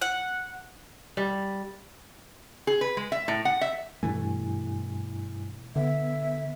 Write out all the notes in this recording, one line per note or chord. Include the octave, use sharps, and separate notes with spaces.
F#5
G3
G#4
B4
G#3
E5
A2
F#5
E5
G2 B2 E3 A3 E4 G#5
D3 B3 E5